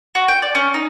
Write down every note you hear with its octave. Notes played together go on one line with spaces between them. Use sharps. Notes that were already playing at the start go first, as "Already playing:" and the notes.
F#4
G5
D5
C#4
D#4